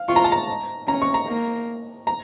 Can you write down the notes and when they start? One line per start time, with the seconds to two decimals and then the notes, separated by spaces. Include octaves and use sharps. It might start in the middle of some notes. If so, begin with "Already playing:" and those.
Already playing: F5
0.08 F4 C#6
0.16 A#5
0.24 A5
0.32 A#5
0.87 C#4 A#5
1.02 C#6
1.14 A#5
1.28 A#3
2.07 A#5